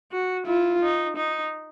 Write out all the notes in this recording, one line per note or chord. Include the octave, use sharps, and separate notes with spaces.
F#4
E4 F4
D#4
D#4